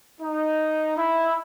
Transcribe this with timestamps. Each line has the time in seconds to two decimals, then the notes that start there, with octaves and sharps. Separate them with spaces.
0.21 D#4
0.97 E4